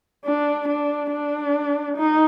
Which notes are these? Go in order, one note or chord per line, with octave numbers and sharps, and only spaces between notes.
D4
D4
D4
D#4